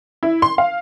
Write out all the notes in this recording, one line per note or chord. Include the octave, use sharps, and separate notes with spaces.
E4
C6
F5